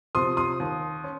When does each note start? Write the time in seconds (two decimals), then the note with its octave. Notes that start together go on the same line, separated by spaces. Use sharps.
0.15 C3 F3 C6 D#6
0.37 C6 D#6
0.60 D#2
1.04 C#4